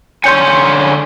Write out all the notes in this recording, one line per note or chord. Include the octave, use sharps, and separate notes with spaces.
D3 C#5 G#5 C6 G6 C#7